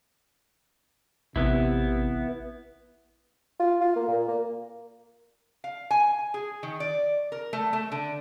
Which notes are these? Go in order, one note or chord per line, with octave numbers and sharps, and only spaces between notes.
A1 C3 B3 E4
F4
F4
A#3
A#2
A#3
F5
G#5
G#4
D#3
D5
A#4
A3
A3
D3